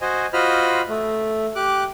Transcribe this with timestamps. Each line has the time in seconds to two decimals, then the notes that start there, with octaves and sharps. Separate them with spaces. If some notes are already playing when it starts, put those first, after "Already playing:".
0.01 F#4 C5 D#5 G#5
0.33 F4 F#4 C5 D#5 B5 F6
0.89 A3
1.56 G4 D6 F#6